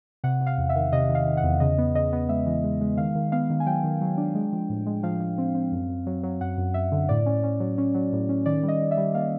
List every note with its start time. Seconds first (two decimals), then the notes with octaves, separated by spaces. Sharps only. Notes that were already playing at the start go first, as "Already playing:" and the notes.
0.24 C3 F#5
0.41 C3
0.46 F5
0.58 E2
0.69 E5
0.76 D#3
0.92 C3 D#5
1.09 D#3
1.15 F5
1.26 D#3
1.37 F#5
1.43 E2
1.60 C#3 D#5
1.78 B3
1.95 C#3 D#5
2.13 B3
2.29 G#3 E5
2.46 E3
2.64 G#3
2.81 G#3
2.97 D#3 F5
3.15 D#3
3.32 B3 F5
3.50 D#3
3.60 G#5
3.66 F#3 G5
3.84 D#3
4.01 F#3
4.17 D4
4.35 G#3
4.53 F3
4.69 A2
4.86 G#3
5.03 F3 F5
5.20 F3
5.38 C4
5.55 C4
5.72 F#2
5.88 F#2
6.06 F#3
6.23 F#3
6.41 F#2 F#5
6.58 F#2
6.74 F#2 E5
6.92 D3
7.09 A2 D5
7.26 C#4
7.44 C#4
7.60 F#3
7.78 C#4
7.95 F#3
8.12 A2
8.29 C#4
8.46 D#3 D5
8.63 G3
8.68 D#5
8.81 G3
8.91 E5
8.97 G3
9.14 A#3 F5